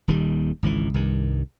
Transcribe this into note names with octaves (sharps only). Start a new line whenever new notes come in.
D#1 D#2 D#3 G3
G#1 C#2 B2 E3
C2 G2 D#3